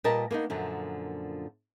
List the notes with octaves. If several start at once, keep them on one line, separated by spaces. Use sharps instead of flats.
A#2 G3 A#4 B4 D#5 A5
A#3 B3 D4 D#4
F#2 A#2 D3 F3